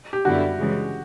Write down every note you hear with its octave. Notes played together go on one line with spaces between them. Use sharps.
G4
F#2 D3 G3 B3 E4 F#4
C#3 E3 G#3